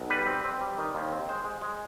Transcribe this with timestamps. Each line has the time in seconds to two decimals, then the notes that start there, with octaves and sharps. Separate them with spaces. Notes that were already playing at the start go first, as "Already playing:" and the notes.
Already playing: B1
0.10 G3 B4
0.27 C4
0.44 C4
0.61 G3
0.78 D#3
0.95 D#2
1.12 C4
1.28 G#3 C5
1.45 G#3
1.61 G#3